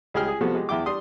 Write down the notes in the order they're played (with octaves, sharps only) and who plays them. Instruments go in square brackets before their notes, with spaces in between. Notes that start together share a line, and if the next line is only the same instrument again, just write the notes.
[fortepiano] C#2 G3 G#4 G5 F6
G#4 G#5
C3 F3 G3 B3 F#4 A4
G#3 G4
E2 E4 G5 D6
G3 D4 C6 D#6